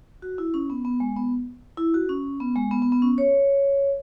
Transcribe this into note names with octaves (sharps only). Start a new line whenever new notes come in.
F#4
E4
C#4
B3
B3
G#3
B3
E4
F#4
C#4
B3
G#3
B3
B3
B3
C#4
C#5